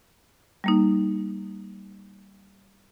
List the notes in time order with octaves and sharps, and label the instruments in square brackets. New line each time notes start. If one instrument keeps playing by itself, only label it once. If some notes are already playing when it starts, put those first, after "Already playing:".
[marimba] G3 A#3 D#4